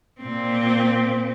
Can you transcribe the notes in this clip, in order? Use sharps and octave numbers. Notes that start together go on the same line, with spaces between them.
A#2 C4